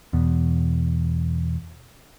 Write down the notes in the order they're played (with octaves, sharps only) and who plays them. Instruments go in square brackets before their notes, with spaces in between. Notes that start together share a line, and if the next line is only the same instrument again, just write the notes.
[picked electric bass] E2 B2